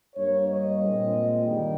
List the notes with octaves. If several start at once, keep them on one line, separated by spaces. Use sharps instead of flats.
G2 G3 A#3 C#5
D#5
A#2 G#3 C4
G2 D#3 G3 A#3 G5